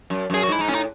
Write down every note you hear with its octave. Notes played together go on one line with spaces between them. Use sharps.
F#2
F#2 G#4
F#4
G#2
E4
G#2 D#4
A2 C#4
D#4